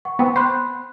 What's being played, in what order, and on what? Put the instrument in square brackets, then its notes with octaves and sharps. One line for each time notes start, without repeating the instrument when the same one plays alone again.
[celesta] F#5 C#6
[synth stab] B3 C4
[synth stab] C5 [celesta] B5 C6 F#6